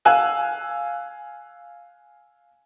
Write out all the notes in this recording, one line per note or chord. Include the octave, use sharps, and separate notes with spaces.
F5 G#5 E6 F#6